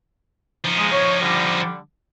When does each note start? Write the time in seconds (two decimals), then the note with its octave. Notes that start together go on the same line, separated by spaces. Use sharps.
0.65 F3 D#4
0.78 G#3
0.92 C#5
1.20 D3 G3